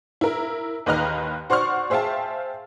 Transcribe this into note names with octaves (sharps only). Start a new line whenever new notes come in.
E4 A#4
D#2 D#3 B4 D#5 A#5 F6
F#4 C5 D5 C6 C#6 F6
G#4 C5 E5 F5 G5 A5